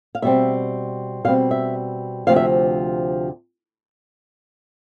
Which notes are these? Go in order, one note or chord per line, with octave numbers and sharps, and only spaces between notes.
F5
B2 G3 C4 E5
B2 G3 C4 F5
E5
D2 C3 F3 C4 F5
E5